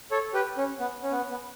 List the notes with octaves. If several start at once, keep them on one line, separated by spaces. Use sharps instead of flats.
A4 C#5
G4 B4
C#4
B3
C#4
B3
B3